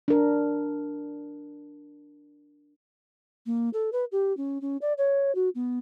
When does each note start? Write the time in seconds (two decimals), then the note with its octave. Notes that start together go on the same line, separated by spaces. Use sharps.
0.08 D4 A#4
3.46 A#3
3.73 A4
3.92 B4
4.12 G4
4.37 C#4
4.62 C#4
4.82 D5
4.98 C#5
5.35 F#4
5.55 B3